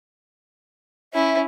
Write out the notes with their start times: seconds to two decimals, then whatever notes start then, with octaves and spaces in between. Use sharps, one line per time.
1.14 C#4 E4 E5